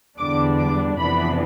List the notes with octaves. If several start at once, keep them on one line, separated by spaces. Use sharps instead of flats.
E2 D3 G3 D4 D6
D6
F2 C3 E3 B3 D4 B5